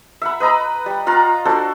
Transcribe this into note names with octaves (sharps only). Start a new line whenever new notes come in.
E5 F#5 B5
B4 D#5 A#5 B5
G3
F4 F5 F#5 A#5
D4 F#4 A4 C5